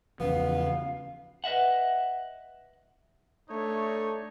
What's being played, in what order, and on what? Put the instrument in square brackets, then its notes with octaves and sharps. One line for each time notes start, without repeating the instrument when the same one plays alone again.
[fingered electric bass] E2 C#3 F3 [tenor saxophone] B3 [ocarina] F5
[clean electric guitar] B4 D#5 E5 F#5
[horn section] A3 D4 D#4 C#5